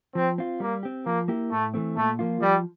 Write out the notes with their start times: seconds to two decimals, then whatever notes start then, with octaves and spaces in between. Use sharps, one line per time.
0.15 F3 C4
0.38 C4 F4
0.60 G3 A#3
0.83 C4 G4
1.06 F3 A#3
1.28 A#3 E4 G4
1.51 A2 A3
1.74 E3 A3 C4
1.96 A#2 A3
2.19 F3 A#3 F4
2.41 F3 G3